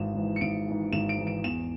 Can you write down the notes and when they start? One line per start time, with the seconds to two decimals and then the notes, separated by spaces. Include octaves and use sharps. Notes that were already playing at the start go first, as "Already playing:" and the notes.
Already playing: G#1 G#2 E3 E7
0.15 G#2 E3
0.36 C#7
0.41 G#1 D7
0.67 G#2 E3
0.92 G#1 E7
1.09 D7
1.18 G#2 E3
1.27 D7
1.44 E2 E7